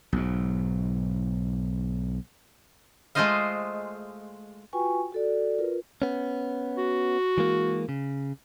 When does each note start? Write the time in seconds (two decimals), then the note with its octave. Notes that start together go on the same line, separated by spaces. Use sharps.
0.13 B1 G#2
3.15 G#3 A3 F4 C5 D#5 F5
4.73 F4 F#4 B4 G5 G#5 C#6
5.12 F#4 A4 D5
5.59 F4 A#4 B4
6.02 B3 C#4
6.78 F#4
7.38 E3 G#3 A#3
7.89 C#3